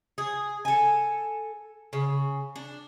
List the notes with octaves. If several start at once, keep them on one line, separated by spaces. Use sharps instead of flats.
G#4
A4 G#5
C#3
D4